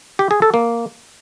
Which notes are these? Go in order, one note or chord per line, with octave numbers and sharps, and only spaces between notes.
G4
G#4
A4
A#3